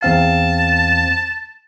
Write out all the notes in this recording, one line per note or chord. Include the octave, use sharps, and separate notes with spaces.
E2 C4 F5 A5